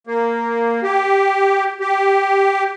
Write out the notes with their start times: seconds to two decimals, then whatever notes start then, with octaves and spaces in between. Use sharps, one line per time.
0.07 A#3
0.83 G4
1.80 G4